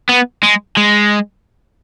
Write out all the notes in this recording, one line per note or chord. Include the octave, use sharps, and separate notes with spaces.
B3
G#3
G#3